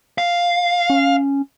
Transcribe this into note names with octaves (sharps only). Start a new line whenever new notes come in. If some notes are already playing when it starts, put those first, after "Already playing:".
F5
C#4